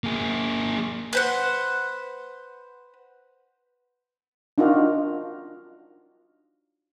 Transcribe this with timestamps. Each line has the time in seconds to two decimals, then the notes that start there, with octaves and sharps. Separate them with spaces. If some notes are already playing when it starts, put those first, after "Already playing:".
0.04 A#3 G#4
1.13 B4 C5 F#5
4.58 D4 D#4 F4 F#4 A#4